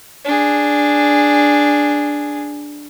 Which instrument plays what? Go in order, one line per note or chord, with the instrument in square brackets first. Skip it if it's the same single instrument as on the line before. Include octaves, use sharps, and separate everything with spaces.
[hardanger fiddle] D4 G#4